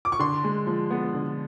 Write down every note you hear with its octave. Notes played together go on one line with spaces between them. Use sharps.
D6
C#6
D3 C6
G#3
F3
B3
D3